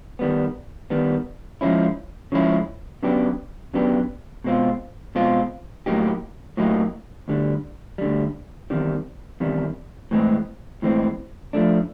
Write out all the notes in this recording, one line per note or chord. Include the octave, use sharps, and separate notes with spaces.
D#3 G3 B3
D#3 G3 B3
C#3 F3 G#3 C#4 E4
C#3 F3 G#3 C#4 E4
C#3 F#3 B3 D4 G4
C#3 F#3 B3 D4 G4
B2 G#3 C4 F4
B2 G#3 C4 F4
A2 F#3 A#3 D#4 G4
A2 F#3 A#3 D#4 G4
D2 D3 G3
D2 D3 G3
E2 C3 D#3 G3
E2 C3 D#3 G3
A2 E3 G#3 C4
A2 E3 G#3 C4
F3 A3 D4